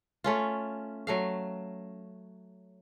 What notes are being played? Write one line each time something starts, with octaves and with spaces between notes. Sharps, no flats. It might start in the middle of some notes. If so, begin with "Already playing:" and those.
A3 C#4 F4
F#3 A3 F5